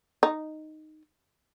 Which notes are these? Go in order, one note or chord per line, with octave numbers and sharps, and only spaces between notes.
D#4